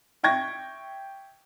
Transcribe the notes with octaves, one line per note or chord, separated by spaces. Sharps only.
E5 G5 C#6 G#6 A#6